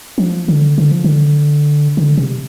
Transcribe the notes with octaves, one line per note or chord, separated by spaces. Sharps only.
F3
D3
D3
F3
D3
D3
C3